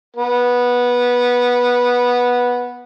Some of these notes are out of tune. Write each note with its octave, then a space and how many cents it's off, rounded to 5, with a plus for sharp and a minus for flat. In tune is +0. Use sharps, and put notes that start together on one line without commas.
B3 -15